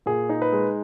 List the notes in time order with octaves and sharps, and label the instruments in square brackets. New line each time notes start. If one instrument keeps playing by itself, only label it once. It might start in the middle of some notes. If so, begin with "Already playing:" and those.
[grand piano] A#2 G#4
D#4
B4
G#3